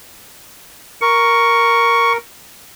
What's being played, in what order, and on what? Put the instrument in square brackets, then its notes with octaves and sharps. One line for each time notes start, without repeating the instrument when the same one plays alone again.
[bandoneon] A#4 [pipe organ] C#6